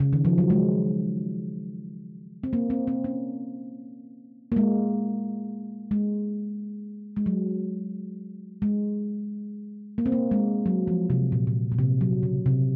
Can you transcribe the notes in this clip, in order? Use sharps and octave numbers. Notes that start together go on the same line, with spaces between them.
C#3
D#3
F3
F#3
G#3
C4
A#3
C4
C4
C#4
A#3
G#3
G#3
G#3
F#3
G#3
A#3
C4
A#3
G#3
F#3
F3
C3
A#2
A#2
A#2
C3
F#3
C#3
C3